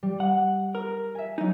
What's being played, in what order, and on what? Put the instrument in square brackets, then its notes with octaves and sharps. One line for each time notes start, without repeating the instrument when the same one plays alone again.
[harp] G3
[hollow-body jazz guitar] F#5
A#4
[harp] E5 G#5
[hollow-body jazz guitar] F#3 D#4